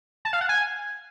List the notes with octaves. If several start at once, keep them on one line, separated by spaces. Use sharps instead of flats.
A5
F5
F#5
G#5